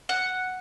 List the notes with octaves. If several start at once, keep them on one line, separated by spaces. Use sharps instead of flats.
F#5